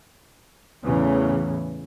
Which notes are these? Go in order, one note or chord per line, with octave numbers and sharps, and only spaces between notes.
E2 A2 C#3 E3